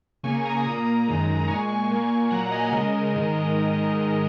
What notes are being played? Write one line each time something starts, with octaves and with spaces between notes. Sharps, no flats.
C#3 A#3 G#5 C#6
A#5 D#6
A#2 A#3
F#2 D#3 G#3
A#2 G#3 G#5 C#6
A#2 A#3
A#2 F#3 A#3 F#5 A#5
D#5 G#5
C#3 G#3 A#4 D#5
G#2 D#3 G#3